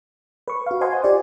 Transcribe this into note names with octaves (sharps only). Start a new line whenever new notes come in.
B4 C#6
F#4 F5
C5 D#5 F#5 G#5 C6
F4 G4 C5 D5